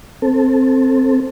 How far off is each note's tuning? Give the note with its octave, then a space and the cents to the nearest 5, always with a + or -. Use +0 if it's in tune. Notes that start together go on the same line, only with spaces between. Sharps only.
C4 +5 A4 +10